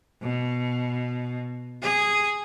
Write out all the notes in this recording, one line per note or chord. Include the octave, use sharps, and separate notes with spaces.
B2
G#4